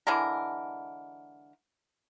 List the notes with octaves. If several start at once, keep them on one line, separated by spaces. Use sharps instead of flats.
D3 E3 G#3 A#4